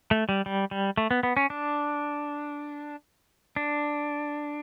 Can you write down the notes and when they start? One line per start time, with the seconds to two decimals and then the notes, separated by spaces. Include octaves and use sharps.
0.11 A3
0.29 G3
0.46 G3
0.71 G3
0.98 A3
1.11 B3
1.23 B3
1.37 C#4
1.50 D4
3.56 D4